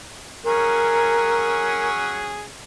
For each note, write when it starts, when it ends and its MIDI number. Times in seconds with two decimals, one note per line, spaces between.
0.44 2.45 54
0.44 2.45 61
0.44 2.45 68
0.44 1.88 70